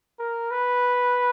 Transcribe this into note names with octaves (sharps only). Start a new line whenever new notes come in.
A#4
B4